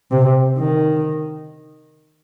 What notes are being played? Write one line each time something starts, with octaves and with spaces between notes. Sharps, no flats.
C3
D#3